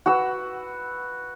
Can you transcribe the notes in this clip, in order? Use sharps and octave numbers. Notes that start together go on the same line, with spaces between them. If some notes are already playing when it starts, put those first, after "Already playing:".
F#4 B4 E6